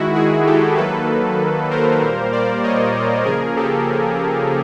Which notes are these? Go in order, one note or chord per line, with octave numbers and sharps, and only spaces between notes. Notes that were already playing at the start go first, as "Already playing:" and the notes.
Already playing: D#3 G#3 E4 F#4
F#4 G#4
G4 A4
D#3 F#3 A#3 A4 B4
A#4 C5
A#2 G3 A#3
C5 D5
C#5 D#5
C#3 F3 A#3 G#4 A#4
G4 A4